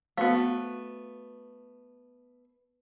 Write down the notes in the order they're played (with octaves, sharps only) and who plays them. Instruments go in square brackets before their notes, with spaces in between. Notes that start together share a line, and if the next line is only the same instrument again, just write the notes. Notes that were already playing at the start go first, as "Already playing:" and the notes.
[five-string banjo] A3 B3 [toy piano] F#4 C5 F5